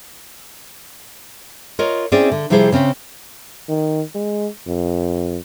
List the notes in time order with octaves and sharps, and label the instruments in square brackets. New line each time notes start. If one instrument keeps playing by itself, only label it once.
[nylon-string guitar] F4 A#4 C#5 D#5
C4 C#4 E4 G#4 C5 D5
D3
C3 F3 G3 E4 G#4 C5
C#3 C4 C#4 C5
[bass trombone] D#3
G#3
F2